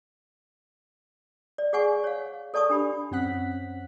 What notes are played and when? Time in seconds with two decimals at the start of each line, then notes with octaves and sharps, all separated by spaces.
1.58 D5
1.73 G#4 D5 F#5 G#5 C#6
2.04 C#5 F5
2.54 A4 D5 A5 C#6 D#6
2.70 D4 G4 B5
3.11 F#2 C4 C#4 F#5 F#6 B6